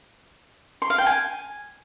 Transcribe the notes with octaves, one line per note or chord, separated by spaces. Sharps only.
C6
F5
G5
G#5